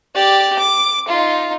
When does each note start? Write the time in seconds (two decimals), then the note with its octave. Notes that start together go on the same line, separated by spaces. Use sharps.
0.15 G4 D5
0.59 D6
1.08 D#4 F4